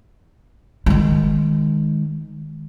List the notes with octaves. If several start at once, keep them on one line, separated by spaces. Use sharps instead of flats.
D#3 G#3